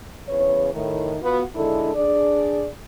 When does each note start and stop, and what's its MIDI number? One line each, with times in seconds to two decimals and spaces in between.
0.29 0.71 40
0.29 0.71 49
0.29 0.71 71
0.29 0.71 73
0.73 1.16 45
0.73 1.16 51
1.21 1.42 59
1.21 1.42 65
1.21 1.42 66
1.55 1.92 50
1.55 1.92 51
1.55 1.92 56
1.55 1.92 62
1.55 1.92 64
1.55 1.92 69
1.94 2.66 62
1.94 2.66 68
1.94 2.66 74